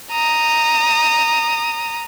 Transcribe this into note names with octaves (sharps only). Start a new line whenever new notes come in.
A#5 D#6